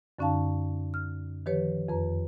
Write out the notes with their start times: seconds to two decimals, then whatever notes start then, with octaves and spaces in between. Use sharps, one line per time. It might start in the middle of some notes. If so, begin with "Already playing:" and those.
0.19 F#2 D3 C#4 D#4 F5 A5
0.94 F6
1.46 D#3 F3 G4 B4 C#5
1.88 F2 B4 A#5